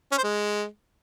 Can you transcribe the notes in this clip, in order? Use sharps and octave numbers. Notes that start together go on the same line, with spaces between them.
C#4
C5
G#3